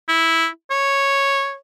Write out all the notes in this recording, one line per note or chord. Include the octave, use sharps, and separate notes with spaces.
E4
C#5